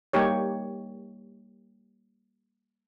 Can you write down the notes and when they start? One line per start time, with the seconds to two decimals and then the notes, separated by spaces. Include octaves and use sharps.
0.13 G3 A#3 D#4 G4 C#5